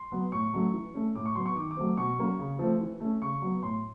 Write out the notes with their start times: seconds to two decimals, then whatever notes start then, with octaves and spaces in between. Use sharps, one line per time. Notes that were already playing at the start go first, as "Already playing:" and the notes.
Already playing: C6
0.12 F#3 B3
0.32 A2 C#6
0.53 F#3 A3 C#4
0.73 E3
0.94 A3 C#4
1.15 A2 D6
1.26 C#6
1.35 F#3 B3 C6
1.46 C#6
1.56 D#3 D6
1.71 D6
1.77 F#3 A3 C4
1.97 B2 C#6
2.18 F#3 A#3 C#4
2.39 C#3
2.59 F3 A3 C4
2.81 E3
3.00 A3 C#4
3.22 C#3 C#6
3.42 F#3 B3
3.63 A2 C6